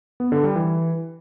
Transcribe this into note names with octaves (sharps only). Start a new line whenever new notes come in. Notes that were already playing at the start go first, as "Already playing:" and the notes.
B3
D3
G3
E3